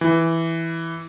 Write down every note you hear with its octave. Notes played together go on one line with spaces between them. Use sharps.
E3